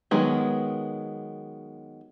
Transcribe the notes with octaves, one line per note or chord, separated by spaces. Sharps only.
D#3 F#3 G#3 B3